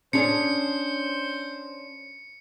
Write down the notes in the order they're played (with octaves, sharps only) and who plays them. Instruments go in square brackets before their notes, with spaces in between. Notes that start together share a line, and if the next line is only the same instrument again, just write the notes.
[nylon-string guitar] C#4 D4 G#4 [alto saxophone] C5 [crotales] C#7